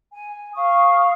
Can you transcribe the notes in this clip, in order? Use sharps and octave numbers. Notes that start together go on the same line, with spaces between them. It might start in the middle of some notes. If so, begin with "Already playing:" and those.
G#5
F5 C#6 D#6